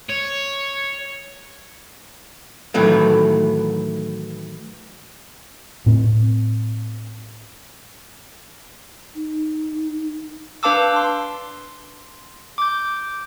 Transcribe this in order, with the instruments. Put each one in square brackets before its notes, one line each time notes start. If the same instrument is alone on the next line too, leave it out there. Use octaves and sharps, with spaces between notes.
[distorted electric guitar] C#5
[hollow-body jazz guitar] A2 D#3 E3 F#3 A3
[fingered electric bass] A2 C4
[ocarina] D#4
[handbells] D4 B4 F5 A5 D6 E6
C6
D6 G6